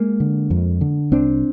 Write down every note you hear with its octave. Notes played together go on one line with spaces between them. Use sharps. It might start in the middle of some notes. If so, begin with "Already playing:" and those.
Already playing: G#3 A#3
D3
F2
D3
C2 C4 D4